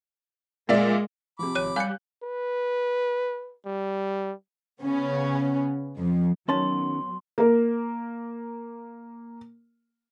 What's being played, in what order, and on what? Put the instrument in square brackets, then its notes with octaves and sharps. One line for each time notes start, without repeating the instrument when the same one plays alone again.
[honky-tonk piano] A#2 D5 E5 [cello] G#3
[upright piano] C3 F3 [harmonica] B5 D6
[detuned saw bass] G#1 [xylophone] C#5 F#6 D#7
[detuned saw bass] G3 [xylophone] F5 C#7 [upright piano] G#5 F#6 G6
[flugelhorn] B4
G3
[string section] C#3 B3 C#4
F2 F3
[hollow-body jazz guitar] D#3 C#4 A5 [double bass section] F#3 B3 [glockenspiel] C6
[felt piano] A#3 A#4